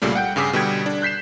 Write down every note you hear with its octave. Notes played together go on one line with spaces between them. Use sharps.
C2 A#2 C#3 G3 A3
F#5 G5 G6
G2 C#3 G#4 D6 E6 B6
B2 D3 G3 G5 G#6
D4
F#6 G6 B6 C7 E7